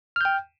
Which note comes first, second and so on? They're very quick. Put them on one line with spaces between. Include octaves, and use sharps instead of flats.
F6 G6 G5